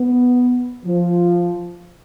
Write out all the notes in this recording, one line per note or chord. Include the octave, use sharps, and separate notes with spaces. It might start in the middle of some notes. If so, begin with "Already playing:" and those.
Already playing: B3
F3